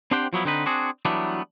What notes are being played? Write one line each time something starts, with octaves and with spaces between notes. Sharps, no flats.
C4 D4 G4 C5 F#5 G5
F3 F#3 B3 E4
D3 C4 D#4 B4
C4 D4 F#4 G#4
E3 F#3 G3 A3 B3 D4